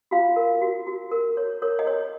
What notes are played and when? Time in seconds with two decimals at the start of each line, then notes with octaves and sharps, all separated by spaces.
0.11 F4 F#4 F5
0.36 A#4
0.62 F#4
0.87 F#4
1.11 A#4
1.37 C#5
1.62 A#4 C#5
1.79 D#5
1.87 C#5